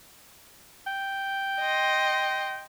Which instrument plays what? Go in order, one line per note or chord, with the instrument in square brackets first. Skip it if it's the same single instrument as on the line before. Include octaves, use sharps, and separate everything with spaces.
[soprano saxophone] G5
[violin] D#5 C6